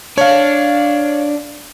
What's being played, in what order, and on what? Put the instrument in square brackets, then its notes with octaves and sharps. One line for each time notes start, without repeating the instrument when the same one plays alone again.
[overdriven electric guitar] D4 [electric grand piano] C#5 F5